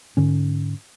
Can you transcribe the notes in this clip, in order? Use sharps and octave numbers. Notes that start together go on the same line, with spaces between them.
G#2 D3 C#4